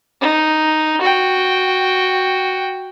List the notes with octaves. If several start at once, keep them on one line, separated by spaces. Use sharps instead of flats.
D#4
F#4 G5